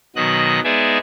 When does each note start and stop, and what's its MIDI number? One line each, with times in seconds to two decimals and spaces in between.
0.16 0.60 47
0.16 0.60 51
0.16 0.60 54
0.16 0.60 75
0.16 0.60 90
0.64 0.98 56
0.64 0.98 59
0.64 0.98 63
0.64 0.98 68
0.64 0.98 74
0.64 0.98 76